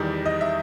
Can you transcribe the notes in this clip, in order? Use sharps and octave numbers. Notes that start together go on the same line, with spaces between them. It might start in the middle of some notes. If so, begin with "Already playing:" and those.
Already playing: E2 D#3 G3
D#5
E5